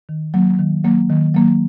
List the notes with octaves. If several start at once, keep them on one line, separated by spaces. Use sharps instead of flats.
D#3
F#3 A#3
D#3
F#3 A#3
D#3
F#3 A#3